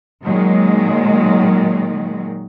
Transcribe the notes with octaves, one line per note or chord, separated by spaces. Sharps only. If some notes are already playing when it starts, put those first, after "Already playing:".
A#2 D#3 F#3 G#3